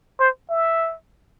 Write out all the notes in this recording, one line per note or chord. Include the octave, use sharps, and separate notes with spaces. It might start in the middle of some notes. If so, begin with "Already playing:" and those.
C5
E5